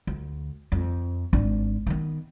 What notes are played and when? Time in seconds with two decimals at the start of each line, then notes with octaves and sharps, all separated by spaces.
0.07 D2
0.72 F2
1.33 G#1 D4
1.87 D#3 B3